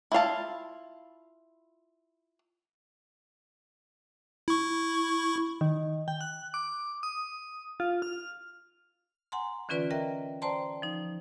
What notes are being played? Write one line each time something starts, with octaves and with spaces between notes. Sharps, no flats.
E4 F4 F5 A5
E4 C#6
D#3
G5
F#6
D6
D#6
F4
F6
F#5 G#5 A#5 C6
D3 E3 C#4 F4 B4 D5
A#4 D#5 E5 G5 A#5
C5 D5 G5 A5 A#5 C6
F3 D#4